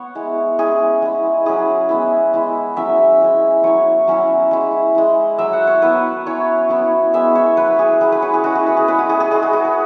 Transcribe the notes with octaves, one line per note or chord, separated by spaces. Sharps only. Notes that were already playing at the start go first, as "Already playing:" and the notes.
Already playing: B3 C#5
G#3 E4
G#3 C#4 E4 G#4
G#3 E4
F#3 C#4 E4 G#4
G#3 B3 E4
G#3 E4
F#3 C#4 E4 E5
G#3 C#4 E4
F#3 E4 C#5
F#3 C#4 E4
G#3 E4
G#3 E4
F#3 E4 E5
F#5
C#5
F#3 B3 E4 B4
F#3 C#4 E4 C#5
F#3 B3 E4
G#3 B3 E4 E5
C#5
F#3 E4 B4
G#4
F#3 C#4 E4 G#4
B4
C#5
G#4
G#3 C#4 E4 F#4
G#4
B4
G#4
G#3 C#4 E4 B4
F#4
G#4
G#4
G#3 E4 G#4
F#4
F#4
B4